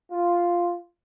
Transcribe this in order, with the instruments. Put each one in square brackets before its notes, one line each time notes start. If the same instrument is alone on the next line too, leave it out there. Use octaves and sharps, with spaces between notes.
[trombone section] F4